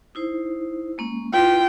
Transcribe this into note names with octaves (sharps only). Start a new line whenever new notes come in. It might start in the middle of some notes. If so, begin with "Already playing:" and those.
D#4 E4 C5
G#3 A#3 C#4
E4 F4 B4 G5 C6